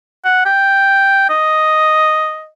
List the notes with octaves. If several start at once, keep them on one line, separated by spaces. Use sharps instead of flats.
F#5
G5
D#5